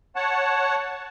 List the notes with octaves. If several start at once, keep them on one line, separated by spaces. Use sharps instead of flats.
C#5 F#5 A5